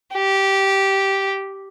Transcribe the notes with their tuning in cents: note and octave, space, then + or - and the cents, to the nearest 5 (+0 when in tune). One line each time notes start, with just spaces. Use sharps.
G4 -10